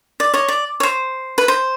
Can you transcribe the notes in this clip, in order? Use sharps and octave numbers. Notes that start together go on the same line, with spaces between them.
D5
C#5 D#5
D5
C#5
C5
B4
C5